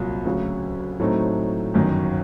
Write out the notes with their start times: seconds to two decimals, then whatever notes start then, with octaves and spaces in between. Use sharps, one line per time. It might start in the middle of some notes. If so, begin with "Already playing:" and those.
Already playing: C2 A#2 F#3 A#3
0.25 D2 C#3 F#3
0.99 A2 F#3 A3 C4 D#4
1.74 G1 F#2 D#3